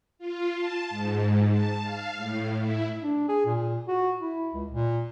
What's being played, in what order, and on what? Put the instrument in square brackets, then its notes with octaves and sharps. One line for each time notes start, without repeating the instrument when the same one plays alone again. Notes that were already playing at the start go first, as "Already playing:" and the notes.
[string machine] F4
A5
G#2
A5
F5
A2
E4
[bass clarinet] D4
G#4
A#2
F#4
E4
C#2
A#2